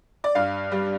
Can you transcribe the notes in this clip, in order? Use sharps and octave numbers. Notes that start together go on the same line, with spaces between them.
D5
G2 F5
G3